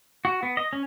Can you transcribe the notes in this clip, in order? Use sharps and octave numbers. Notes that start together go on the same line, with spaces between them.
F#4
B3
D#5
C#4